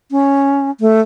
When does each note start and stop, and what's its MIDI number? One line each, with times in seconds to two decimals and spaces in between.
0.11 0.71 61
0.80 1.01 57